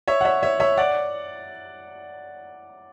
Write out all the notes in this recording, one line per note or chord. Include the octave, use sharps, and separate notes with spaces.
C#5 E5
F#5
C#5 E5
C#5 E5
C#5 E5
D5 F#5